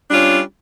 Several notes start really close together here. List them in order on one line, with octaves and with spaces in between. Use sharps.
G3 D4 F4 C#4